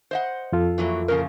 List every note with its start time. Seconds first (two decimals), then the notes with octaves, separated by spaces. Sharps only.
0.11 C5 D#5 F#5
0.52 F2 F4 A4
0.78 E3 F#3 A#3
1.08 A#2 C#3 F3 A#4